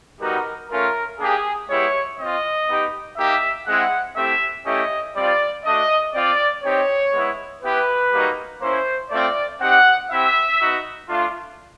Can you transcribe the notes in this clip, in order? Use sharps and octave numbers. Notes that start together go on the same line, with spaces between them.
G3 B3 D#4 F#4 A#4
A3 C#4 F4 A#4
A#3 D4 G4 G#4
G#3 B3 E4 G4 C#5
C4 F4 D#5
B3 D#4 G4
A#3 D#4 G4 E5
G#3 C4 E4 F#5
A3 C4 E4 G4 E5
A3 C#4 E4 G4 D#5
G3 C4 F4 D5
A3 D4 F#4 D#5
C4 F4 D5
C4 D#4 G4 C#5
G#3 B3 E4
B3 E4 G4 B4
G3 A#3 D#4 F#4
A#3 C#4 E4 C5
A3 C4 F4 D5
C4 D#4 G4 F#5
C4 E4 G4 E5
B3 D#4 F#4
A3 D4 F4